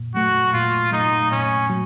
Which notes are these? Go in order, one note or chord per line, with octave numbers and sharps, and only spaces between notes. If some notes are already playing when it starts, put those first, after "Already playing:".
Already playing: A#2
F#3 A3 F#4
A#2 F4
F#3 A3 D#4
A#2 C#4
F#3